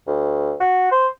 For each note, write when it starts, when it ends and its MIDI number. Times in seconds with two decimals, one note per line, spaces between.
0.07 0.55 38
0.60 0.89 66
0.92 1.08 72